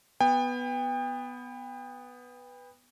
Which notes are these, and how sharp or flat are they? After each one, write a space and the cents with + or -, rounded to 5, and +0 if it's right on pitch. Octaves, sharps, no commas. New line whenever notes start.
B3 +0 G5 +35